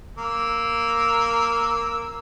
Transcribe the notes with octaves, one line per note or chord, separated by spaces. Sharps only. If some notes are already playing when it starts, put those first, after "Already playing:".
A#3 E6